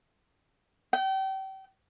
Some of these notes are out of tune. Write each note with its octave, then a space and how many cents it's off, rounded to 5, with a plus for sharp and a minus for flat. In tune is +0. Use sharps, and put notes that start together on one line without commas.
G5 -35